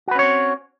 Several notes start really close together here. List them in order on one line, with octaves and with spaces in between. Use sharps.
F#4 B4 C#4 C#5 C4